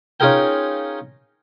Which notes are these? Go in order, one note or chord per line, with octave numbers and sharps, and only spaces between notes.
C#4 D#4 F4 G#4 A#4 G5